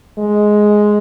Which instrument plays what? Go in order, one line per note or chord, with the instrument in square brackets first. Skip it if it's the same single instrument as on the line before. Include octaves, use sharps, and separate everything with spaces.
[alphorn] G#3